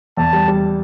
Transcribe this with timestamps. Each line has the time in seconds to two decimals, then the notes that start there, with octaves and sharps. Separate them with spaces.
0.17 E2 A5
0.33 G3
0.48 G3